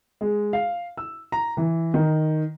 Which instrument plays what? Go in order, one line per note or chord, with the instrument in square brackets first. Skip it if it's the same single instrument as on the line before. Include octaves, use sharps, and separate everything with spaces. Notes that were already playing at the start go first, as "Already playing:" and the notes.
[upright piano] G#3
F5
E6
A#5
E3
D#3